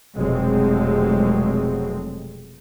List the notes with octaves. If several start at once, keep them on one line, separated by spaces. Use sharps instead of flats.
F1 B2 F#3 G#3 C4